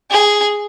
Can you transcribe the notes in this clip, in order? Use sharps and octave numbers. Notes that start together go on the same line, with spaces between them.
G#4